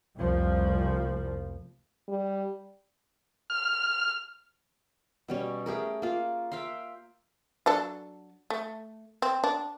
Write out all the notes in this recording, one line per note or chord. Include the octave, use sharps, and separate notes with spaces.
F1 C2 F3 G3 A#3
G3
F6
B2 G3 C#4
A3 G4 G#4 A#4
A#3 F4
E5 F5 G5 C6
F#3 D4 A4
A3
C4
D4